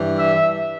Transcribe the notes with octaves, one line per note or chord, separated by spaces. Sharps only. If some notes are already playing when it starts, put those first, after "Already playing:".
Already playing: G2 E3
E5